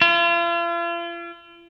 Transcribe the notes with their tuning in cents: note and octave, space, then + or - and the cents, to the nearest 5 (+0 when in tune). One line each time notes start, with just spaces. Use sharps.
F4 -40